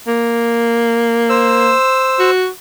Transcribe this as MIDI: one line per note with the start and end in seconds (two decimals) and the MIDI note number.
0.08 1.73 58
1.29 2.31 72
1.29 2.31 88
2.19 2.48 66